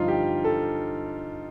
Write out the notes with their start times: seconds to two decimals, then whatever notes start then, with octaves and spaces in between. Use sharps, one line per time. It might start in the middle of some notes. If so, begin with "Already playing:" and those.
Already playing: G2 D3 F3 D#4 F4
0.08 G4
0.44 A4